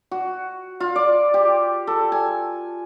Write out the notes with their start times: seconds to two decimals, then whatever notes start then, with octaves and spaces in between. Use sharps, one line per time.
0.11 F#4
0.80 F4
0.96 D5
1.34 G4
1.87 A4
2.12 G#5